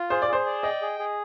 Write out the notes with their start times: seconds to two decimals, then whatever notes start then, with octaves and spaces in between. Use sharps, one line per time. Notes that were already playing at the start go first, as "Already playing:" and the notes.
Already playing: F4
0.10 G#4 C5
0.22 D5
0.28 G#4 C5
0.46 D5
0.63 D#5 G5
0.82 G#4
0.99 G#4